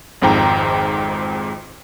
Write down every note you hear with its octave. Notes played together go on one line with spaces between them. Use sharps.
G#1 F2 G#2 G5 A#5